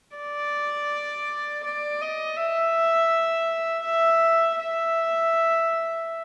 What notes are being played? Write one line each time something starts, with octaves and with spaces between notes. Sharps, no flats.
D5
D5
D#5
E5
E5
E5